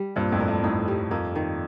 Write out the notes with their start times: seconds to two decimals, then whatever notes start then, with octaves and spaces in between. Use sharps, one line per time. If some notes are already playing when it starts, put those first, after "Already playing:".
Already playing: G3
0.16 G2 A#2 C4
0.32 F2 A2
0.40 A#4
0.48 G2
0.63 F2 A2 D#4
0.88 G3
1.11 F2 A#3
1.35 D#3